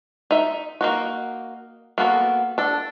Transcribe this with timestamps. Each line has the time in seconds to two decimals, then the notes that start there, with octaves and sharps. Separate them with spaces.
0.31 D#4 E5
0.81 A#3 D#4 F#4
1.98 A#3 B3 F#4 A4
2.58 D4 A4